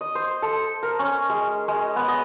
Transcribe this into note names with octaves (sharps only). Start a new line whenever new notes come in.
D#5
C5
A4
A#4
C#4
G#3
G#3
B3
D#5